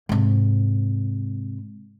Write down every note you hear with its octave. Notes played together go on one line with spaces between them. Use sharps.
G#2 C3